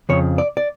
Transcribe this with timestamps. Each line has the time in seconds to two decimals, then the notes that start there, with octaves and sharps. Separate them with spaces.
0.09 F2 C#3 F3 C#5
0.38 D5
0.57 D5